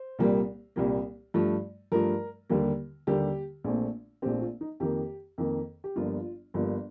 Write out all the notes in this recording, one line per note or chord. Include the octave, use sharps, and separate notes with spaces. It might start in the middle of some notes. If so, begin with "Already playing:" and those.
Already playing: C5
C2 A#2 G3 A#3
C2 A#2 G3 A#3
G2 F3 A3
G2 F3 A3 A#4
D#2 D3 G3 A#3
D#2 D3 G3 A#3 G4
A#1 A#2 A3 C4
A#1 A#2 A3 C4 G4
F4
D#4
F2 D#3 A#3 G4
F2 D#3 A#3
G4
G1 G2 F3 A#3 F4
G1 G2 F3 A#3